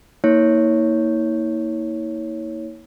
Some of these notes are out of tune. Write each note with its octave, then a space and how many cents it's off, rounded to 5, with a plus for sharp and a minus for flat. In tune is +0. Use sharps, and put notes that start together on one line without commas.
A#3 +0 E4 -45 C#5 +0